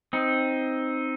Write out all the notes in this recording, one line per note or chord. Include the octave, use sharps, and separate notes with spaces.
C4 D#4